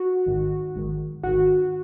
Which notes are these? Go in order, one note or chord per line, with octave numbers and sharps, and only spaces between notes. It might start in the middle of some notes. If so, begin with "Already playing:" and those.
Already playing: F#4
G#1 G#2 D#3
G#1 G#2 D#3
G#1 G#2 D#3 F#4